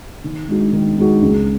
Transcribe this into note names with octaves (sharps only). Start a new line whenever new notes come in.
D#3
G#3 D#4 F#4
D#3
G#3 D#4 F#4
C#2